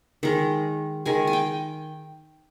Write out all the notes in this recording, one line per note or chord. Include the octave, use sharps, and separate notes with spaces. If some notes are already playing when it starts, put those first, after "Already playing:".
D#3 G#3 A#5
D#3 G#3 G#5
G#5
G5